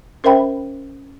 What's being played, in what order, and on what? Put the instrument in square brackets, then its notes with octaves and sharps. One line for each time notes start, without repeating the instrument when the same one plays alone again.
[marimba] C#4 A#4 C5 E5 G5 B5